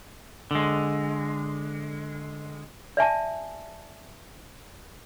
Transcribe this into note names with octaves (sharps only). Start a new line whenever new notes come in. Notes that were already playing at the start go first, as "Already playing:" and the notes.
D3 G#3
D5 E5 G#5 A5